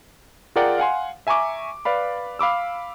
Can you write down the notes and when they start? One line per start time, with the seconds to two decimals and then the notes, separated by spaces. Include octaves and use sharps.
0.56 F4 G#4 A#4 D5 F#5 G5
0.78 F5 F#5 G#5 C6
1.27 E5 G#5 A#5 C#6 D6
1.85 B4 D5 F5 B5
2.39 F5 B5 D6 E6